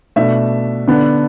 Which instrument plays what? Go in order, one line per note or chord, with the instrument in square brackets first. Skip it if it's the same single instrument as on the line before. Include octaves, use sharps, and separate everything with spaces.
[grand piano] B2 A3 D4 E5
D3 B3 D4